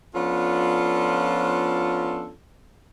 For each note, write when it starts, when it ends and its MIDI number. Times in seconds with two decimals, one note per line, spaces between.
0.15 2.32 53
0.15 2.32 59
0.15 2.32 61
0.15 2.32 62
0.15 2.32 65
0.15 2.32 69